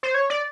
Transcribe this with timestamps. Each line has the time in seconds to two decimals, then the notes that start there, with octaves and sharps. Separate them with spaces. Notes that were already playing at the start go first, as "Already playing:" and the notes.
0.03 C5
0.14 C#5
0.30 D5